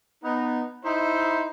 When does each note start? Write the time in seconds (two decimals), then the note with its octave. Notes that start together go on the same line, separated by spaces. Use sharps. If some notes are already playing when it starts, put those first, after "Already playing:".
0.24 B3 D#4
0.84 D#4 E4 C5